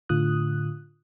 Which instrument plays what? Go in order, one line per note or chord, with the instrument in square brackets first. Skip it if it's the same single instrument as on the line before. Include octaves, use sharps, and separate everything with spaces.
[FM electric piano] A2 D3 F4 D#6 F#6